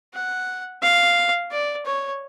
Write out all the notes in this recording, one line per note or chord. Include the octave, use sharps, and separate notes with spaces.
F#5
F5
D5
C#5